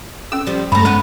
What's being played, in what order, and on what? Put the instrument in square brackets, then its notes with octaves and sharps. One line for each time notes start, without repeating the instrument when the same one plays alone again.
[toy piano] C#4 A4 [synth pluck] E6
[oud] F3 G3
[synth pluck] G2 A#5 [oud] C#3 A3 [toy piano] B5
[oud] A3 B3 C#4 [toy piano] C5